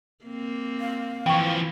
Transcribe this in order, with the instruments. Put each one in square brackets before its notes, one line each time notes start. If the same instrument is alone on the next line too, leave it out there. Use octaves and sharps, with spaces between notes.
[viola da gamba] A#3 C4
[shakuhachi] F5
[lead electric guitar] E3 F3 [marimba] G5 C#6